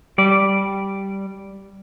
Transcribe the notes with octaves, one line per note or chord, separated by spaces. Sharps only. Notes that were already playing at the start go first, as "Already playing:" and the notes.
G3 D5